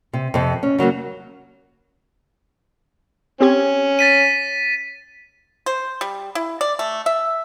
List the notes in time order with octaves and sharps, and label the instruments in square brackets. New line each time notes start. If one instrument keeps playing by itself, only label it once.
[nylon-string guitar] C3
F2 C3
C#4
C#3 F#3 A3 A#3
[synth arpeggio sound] C4 G4 G#6 [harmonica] C#4
[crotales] A6 B6 D#7
[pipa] C5
G3
E4
D5
A3
E5